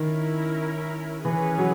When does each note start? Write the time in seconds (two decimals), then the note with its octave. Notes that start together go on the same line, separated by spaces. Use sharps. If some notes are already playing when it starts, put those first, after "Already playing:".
Already playing: D#3 C#4 E4 A#4
1.25 E3 C#4 G#4 B4
1.58 F#3